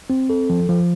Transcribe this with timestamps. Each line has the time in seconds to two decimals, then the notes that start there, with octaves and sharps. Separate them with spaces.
0.10 C4
0.30 A4
0.50 F3
0.69 F3